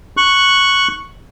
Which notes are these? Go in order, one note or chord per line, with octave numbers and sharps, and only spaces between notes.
C#6 F#6